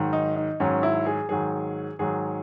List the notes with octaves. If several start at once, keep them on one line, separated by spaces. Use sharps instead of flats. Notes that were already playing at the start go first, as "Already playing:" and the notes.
Already playing: G#2 D#3 F#3
D#4
D#4
G#2 D#3 F#3 C#4
E4
G#4
G#2 D#3 F#3 G#4
G#2 D#3 F#3 G#4